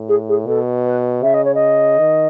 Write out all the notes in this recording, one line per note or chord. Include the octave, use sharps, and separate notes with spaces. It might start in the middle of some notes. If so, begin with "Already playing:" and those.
Already playing: A2
G#4
G#4
B2 A4
B4
C#3 E5
D#5
C#5
D#5
D#3